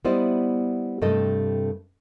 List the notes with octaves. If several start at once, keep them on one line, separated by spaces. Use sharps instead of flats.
G3 B3 E4 C5 D5 D#5
G2 C3 A3 A4 D#5